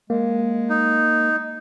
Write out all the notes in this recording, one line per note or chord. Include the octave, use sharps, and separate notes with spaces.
G#3 A#3
D#4